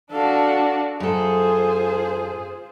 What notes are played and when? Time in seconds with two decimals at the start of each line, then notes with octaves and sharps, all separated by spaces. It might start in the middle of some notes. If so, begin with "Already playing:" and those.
0.11 D4 F#4 A4 F5
1.00 F#2 F4 G#4 A4 C5